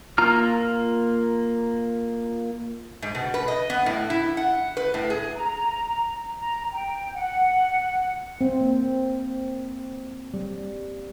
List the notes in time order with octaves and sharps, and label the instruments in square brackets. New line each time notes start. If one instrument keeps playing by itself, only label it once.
[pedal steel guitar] A#3 F4 A#5 F6
[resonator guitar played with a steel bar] G#2
B2
B4
D#5
B3
A2
E4
F#5
B4
A2
G#4
[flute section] A#5
A#5
G5
F#5
[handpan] C4
A#3
G3